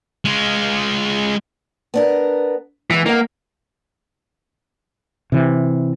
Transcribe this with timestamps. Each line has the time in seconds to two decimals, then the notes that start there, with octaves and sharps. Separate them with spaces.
0.25 G#3 F4
1.94 B3 D4 A#4
2.90 E3 G#3 A3 B3
3.06 A#3 D#5 F#5
5.32 C3 E3